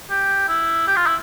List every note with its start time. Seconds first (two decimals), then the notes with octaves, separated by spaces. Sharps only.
0.10 G4
0.49 E4
0.87 G4
0.96 F4
1.06 E4